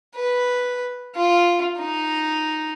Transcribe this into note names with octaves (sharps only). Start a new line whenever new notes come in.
B4
F4
D#4